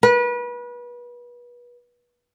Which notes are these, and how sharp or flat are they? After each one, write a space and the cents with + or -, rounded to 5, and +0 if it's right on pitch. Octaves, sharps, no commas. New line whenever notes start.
B4 -30